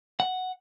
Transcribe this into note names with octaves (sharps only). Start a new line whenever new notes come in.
F#5